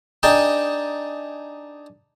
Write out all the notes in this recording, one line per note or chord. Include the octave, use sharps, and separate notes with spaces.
D4 D#4 G#4 G5 A5